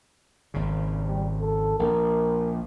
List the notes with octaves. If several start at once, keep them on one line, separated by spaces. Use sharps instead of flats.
G#1 C#3
G3
A4
A#1 A#4